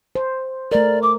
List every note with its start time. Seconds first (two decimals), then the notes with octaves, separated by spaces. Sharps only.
0.15 C5
0.72 A3 A#4 D5
1.03 D6